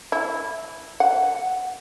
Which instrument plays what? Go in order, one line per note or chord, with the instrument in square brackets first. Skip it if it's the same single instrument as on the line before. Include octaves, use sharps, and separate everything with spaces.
[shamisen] E4
F#5